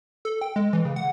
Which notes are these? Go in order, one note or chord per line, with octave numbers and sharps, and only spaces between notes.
A4
G5
G#3
E3
C#3
F#5